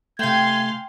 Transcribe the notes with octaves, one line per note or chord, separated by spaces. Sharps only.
C3 A3 F5 G5 G#5 C6 G#6